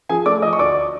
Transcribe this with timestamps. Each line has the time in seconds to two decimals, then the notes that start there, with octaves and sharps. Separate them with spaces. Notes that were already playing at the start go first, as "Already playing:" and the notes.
0.09 F3 G#4 G#5
0.25 A3 D5 D6
0.42 F3 D#5 D#6
0.53 C#6
0.59 D2 D5 D6